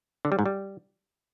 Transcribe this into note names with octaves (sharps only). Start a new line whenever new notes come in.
D3
G3
G#2
G3